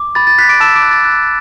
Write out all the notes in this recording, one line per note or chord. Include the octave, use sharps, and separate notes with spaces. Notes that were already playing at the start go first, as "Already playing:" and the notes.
Already playing: D6
B5 A6
A6
F#6 B6
D6 D7
A5 E6 E7
D6 D7
F#6
A6
F#6